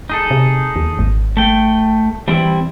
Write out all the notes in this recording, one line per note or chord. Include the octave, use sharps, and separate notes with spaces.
D#4 G#4 A4
C3
D#2
G#1
A3 G5
E3 G3 C4 E4